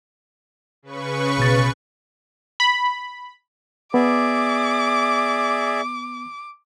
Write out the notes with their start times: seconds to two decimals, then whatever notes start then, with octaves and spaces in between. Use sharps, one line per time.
0.83 C#3 B4 C#6
1.37 A1 B2 A6
2.60 B5
3.94 B3 G#4 D5 E5 D6